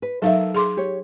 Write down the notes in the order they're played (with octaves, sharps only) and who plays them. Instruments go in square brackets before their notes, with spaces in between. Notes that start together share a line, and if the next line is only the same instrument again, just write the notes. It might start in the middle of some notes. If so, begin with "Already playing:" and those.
[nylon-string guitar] B4
[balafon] F#3 D#4 F5 [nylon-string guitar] A4 A#4 E5
[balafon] G#4 C6 D6
[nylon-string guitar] G4 C#5